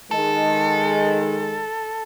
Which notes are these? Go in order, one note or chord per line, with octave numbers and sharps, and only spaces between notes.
D#3 G#3 A4